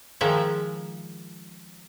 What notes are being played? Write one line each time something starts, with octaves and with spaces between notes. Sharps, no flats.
D#3 F3 G#3 E5